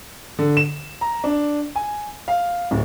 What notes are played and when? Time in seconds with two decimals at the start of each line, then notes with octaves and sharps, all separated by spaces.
0.39 D3
0.57 E7
1.01 A#5
1.24 D4
1.75 G#5
2.28 F5
2.71 D1